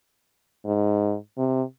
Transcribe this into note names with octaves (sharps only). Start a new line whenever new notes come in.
G#2
C3